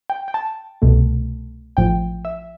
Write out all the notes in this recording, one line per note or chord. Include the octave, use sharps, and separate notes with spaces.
G5
G5
A5
C2 B2 A3
A1 A2 F3 G5
E5